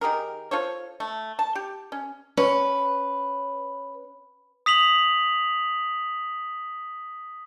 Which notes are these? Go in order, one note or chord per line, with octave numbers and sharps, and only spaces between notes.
D#3 G4 G#4 A#4
F4 A4 C5 C#5
A3
A5
G4
C#4
C#4 B4
D#6 B6 F7 F#7